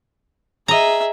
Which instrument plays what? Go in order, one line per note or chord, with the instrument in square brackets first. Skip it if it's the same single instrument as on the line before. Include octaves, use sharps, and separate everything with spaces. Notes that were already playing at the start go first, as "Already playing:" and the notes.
[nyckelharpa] G#4 E5 [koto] D#5 A#5